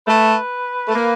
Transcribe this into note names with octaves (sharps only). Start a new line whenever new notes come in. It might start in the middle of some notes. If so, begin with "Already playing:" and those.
A3 B4
A3
A#3